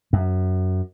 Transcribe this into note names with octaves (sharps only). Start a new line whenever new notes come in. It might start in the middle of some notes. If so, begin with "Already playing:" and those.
F#2